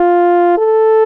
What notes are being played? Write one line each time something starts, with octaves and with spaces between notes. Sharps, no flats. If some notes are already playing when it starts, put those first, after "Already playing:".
Already playing: F4
A4